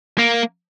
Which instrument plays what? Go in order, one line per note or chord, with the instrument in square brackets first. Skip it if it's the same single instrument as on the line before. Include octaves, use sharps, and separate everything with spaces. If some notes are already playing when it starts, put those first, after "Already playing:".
[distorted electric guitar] A#3